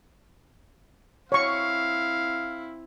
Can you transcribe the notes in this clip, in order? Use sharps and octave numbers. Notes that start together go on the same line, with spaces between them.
C4 E4 C#5 F5 C#6